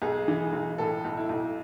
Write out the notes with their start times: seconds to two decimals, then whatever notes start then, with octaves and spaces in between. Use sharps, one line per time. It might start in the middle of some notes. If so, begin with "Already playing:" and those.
0.02 B1 G#4
0.28 E3
0.53 B1
0.78 A2 A4
1.05 B1
1.17 E4
1.29 B1